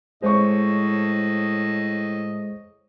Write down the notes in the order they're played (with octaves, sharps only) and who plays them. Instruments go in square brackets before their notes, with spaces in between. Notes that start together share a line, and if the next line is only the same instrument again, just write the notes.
[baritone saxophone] A2 [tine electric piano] G#3 G#4 [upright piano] C5 C#5 C#6 [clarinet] D#5